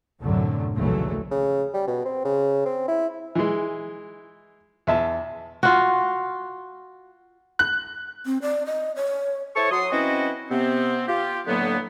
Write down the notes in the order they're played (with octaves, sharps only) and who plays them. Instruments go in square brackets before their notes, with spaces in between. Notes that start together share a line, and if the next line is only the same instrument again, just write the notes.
[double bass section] C2 F#2 A2 D3 F#3 A3
A#1 D#2 C#3 E3 F#3 A3
[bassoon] C#3
G3
B2
C4
C#3
C4
E4
[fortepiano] E3 G#3
E2 E5 A5
[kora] F4 F#4
[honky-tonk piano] F#6
[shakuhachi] C4
D5
D#5
C#5
[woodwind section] E4 A4 C5 C#5 A5 C#6
F#3 C6 D#6
E3 C4 C#4 E4 F#4 D#5
C3 B3 C4
F4 G4
A2 D3 F#3 A#3 B3